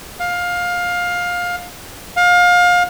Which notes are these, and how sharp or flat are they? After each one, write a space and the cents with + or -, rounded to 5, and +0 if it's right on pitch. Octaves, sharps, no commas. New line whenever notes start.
F5 +20
F5 +30